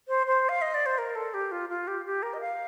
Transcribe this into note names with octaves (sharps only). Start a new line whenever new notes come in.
C5
C5
F5
D#5
D5
C5
A#4
A4
G4
F4
F4
G4
G4
A#4
D#5
F5